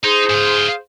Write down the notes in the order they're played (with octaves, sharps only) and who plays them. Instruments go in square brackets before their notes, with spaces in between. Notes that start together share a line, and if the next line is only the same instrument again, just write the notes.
[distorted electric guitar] D#4 [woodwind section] G#4 C5
[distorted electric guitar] G#2 F4